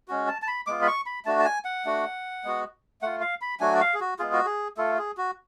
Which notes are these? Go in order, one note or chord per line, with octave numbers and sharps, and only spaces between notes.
G#3 C#4 F#4
A5
A5
B5
G#3 B3 F4 D6
B5
C#6
B5
A3 D4 F#4 A5
A5
G#5
F#5
A3 D4 F#4
G#3 B3 F#4
A3 F4 F#5
F5
B5
F#3 A3 D4 F#4 G#5
D5
F5
G#4
F#4
G#3 B3 F4 G#4
F#4
G#4
A3 F4 A4
G#4
F#4